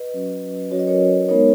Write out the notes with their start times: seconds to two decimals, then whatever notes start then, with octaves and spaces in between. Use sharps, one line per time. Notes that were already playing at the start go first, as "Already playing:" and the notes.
Already playing: B4 D#5
0.14 F#3 C#4 F#4
0.71 F#3 C#4 F#4 C#5
0.79 D#5
0.87 A#4 C#5
1.29 G#3 B3 D#4 A#4 C#5